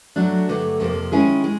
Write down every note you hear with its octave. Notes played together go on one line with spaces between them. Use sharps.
F#3 A3 D4 F#4
G2 D3 F#3 A3
F2 C3 F3 A#3
D#3 G#3 C#4 E4 G#4
G#3